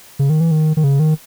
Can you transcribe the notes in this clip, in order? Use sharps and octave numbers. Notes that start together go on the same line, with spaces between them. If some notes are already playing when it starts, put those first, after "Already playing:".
C#3
D#3
E3
D#3
D#3
C#3
D#3